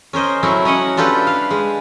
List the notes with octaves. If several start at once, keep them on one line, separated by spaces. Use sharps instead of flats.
C#4 A#4 C5 D#5
F#3 A3 C#4 E4
C#4 D#5 F#5
D4 F4 G4 A4 B4
F5
G#3